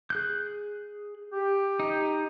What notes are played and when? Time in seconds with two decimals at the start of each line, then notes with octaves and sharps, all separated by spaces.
0.10 G#4 F#6 G6
1.33 G4
1.80 D#4